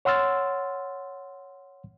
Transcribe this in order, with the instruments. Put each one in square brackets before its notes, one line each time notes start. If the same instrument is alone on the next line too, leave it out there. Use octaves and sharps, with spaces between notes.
[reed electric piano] C#5 F#5 C6 E6 F6 A6